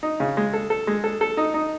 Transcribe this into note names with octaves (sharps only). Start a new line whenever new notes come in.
D#4
C#3
G#3
A4
A4
G#3
A4
A4
D#4
D#4